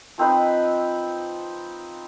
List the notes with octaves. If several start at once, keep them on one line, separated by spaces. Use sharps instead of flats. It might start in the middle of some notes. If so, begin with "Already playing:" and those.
F3 C4 D#4 B4